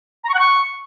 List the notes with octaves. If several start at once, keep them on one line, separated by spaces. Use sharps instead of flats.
A#5
C#6
F#5
C#6